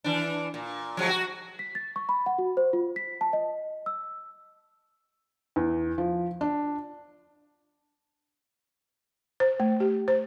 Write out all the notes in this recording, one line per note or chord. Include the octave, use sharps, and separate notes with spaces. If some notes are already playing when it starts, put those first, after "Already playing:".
E3 D4
A#2
F3 F#3 G#3
F#4
B6
A6
C#6
B5
F#5
F#4
C5
F4
B6
A5
D#5
E6
E2
F3
D4
C5
A3
G4
C5